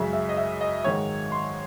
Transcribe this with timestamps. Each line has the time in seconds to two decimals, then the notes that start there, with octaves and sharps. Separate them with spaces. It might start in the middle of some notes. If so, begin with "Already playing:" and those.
Already playing: F#2 C#3 G#3 E5
0.13 E5
0.29 D#5
0.37 E5
0.61 D#5
0.84 G#2 D#3 G#3 C#5
1.32 C6